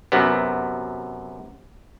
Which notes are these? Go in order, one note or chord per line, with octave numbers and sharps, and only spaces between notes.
F#2 C3 B3